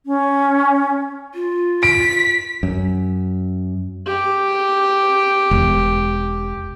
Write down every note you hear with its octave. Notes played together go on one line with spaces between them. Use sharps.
C#4
F4
B6 D7
F#2
G4
E1